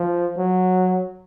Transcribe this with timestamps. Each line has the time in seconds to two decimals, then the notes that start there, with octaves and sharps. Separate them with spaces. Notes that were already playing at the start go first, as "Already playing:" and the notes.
Already playing: F3
0.37 F#3